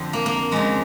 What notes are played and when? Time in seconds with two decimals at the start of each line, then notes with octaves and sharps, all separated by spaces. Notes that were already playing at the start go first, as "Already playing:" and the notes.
Already playing: F2 D3 F3 C4
0.13 A#3
0.26 A#3
0.51 F2 C#3 F3 G#3